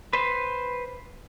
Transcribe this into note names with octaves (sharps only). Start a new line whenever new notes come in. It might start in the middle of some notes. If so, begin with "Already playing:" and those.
B4 C5